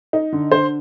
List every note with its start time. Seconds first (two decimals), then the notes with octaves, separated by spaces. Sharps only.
0.13 D#4
0.32 D3
0.52 D3 C5